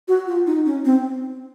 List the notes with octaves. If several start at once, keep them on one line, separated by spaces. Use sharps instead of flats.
F#4
F4
D#4
C#4
C4